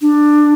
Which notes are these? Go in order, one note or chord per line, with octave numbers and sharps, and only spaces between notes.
D4